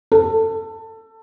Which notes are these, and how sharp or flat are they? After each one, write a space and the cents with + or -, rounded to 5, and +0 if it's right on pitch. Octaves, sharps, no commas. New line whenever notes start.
A4 +20